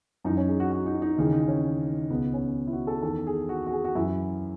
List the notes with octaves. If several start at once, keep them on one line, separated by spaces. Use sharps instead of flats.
F#2 E3 D#4
C#4
G#4
F#4
F#4
D#4
D#4
D#2 C#3 E3 D#4
D#4
C#4
C#2 B2 B3
C#4
E4
F#4
A4
E2 D#3 A4
G#4
F#4
F#4
G#4
F#4
F#2 E3 E4